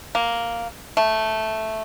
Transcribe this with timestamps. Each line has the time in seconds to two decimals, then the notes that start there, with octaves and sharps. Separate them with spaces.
0.15 A#3
0.97 A3